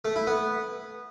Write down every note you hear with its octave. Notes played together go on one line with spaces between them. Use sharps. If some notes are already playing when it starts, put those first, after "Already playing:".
A3
E4
B3